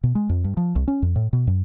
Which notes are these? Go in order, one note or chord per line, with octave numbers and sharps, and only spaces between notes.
B2
G#3
F2
G2
F3
C2
C#4
F2
A2
B2
F#2